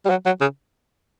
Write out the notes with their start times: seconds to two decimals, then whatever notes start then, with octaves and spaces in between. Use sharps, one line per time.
0.05 G3
0.10 F#3
0.26 F#3
0.41 C#3